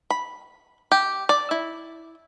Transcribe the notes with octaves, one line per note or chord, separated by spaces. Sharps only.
B5
G4
D5
E4